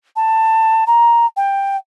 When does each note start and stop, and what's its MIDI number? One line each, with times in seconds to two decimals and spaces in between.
0.16 0.85 81
0.87 1.26 82
1.37 1.77 79